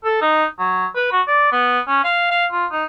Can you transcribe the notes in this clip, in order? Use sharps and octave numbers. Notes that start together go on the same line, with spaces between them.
A4
D#4
F#3
B4
F#4
D5
B3
C#4
F5
F5
F4
D#4